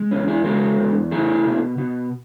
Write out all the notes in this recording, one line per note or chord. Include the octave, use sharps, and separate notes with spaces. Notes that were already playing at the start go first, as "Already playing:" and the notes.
Already playing: G#3
E2 C#4
E4 G#4
G#3 F#4 A4
E2
A3 E4 G#4
B2
B2